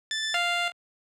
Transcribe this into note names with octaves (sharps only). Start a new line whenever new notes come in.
A6
A6
F5